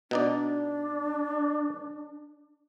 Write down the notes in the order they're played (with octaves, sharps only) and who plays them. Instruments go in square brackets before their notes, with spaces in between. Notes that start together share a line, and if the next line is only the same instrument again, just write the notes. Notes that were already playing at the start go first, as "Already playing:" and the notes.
[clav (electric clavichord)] B2 D#4 D5 [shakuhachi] D4